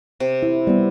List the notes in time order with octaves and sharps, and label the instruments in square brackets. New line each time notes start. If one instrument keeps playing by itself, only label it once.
[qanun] C3
[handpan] E4
G3 B3